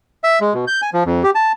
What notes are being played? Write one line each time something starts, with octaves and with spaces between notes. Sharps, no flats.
E5
G#3
B2
G6
G#5
F3
F2
G4
A5